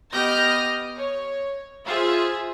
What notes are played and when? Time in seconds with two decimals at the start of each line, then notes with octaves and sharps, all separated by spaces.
0.13 B3 G4 D#5 F6 G6 A#6
0.96 C#5
1.86 F4 G#4 C5 E5